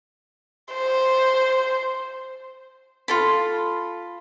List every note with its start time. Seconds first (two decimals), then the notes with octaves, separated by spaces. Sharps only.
0.74 C5
3.08 F4 A4 B5